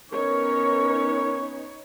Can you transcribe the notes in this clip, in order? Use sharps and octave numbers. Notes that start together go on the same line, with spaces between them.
B3 C#4 D#4 A#4 B4 C#5 C#6